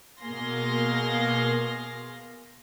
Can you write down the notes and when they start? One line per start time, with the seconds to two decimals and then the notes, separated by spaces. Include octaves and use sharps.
0.22 B2 A#3 G#4 F5 C6 A#6